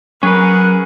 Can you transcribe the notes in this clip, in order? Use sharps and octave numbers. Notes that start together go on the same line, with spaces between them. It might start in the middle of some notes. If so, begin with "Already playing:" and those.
F#3 C#4 G#4 A#4 B4 F#5